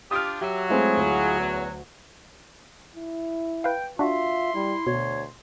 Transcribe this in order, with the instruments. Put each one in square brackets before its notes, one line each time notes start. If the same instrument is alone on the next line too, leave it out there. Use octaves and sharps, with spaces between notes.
[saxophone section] D4 F4 G4 [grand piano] D#6 F6
[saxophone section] F#3 [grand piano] G4 [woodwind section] E5
[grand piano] G#3 A3 C4 [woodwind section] E4 F4 G#4
[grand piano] D2
[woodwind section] E2
[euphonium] E4
[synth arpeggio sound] B4 F5 [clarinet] G5
[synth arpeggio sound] D4 F#4 [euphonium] F4 [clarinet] E5 [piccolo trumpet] C6
[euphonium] G3 [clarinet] E4
[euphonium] D2 [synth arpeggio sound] B2 [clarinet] C#5